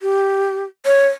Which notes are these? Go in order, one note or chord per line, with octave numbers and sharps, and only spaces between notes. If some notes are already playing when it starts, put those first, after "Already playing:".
G4
C#5